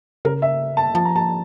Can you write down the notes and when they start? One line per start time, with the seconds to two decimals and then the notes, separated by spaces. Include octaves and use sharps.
0.25 C#3 A#4
0.42 E5
0.77 A5
0.95 F3 A5
1.05 A#5
1.16 A5